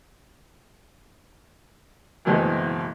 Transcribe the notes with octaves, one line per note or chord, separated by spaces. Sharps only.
F#1 D2 B2 E3 G#3 C4